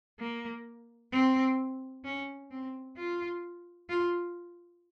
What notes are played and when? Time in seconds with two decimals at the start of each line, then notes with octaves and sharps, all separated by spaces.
0.20 A#3
1.12 C4
2.04 C#4
2.51 C4
2.97 F4
3.89 F4